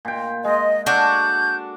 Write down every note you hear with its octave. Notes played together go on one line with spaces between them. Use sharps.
A#2 G5
G#3 D#5
D4 F#4 A4 G6